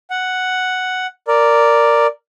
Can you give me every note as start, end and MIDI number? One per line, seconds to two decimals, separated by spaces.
0.10 1.06 78
1.28 2.07 70
1.28 2.07 74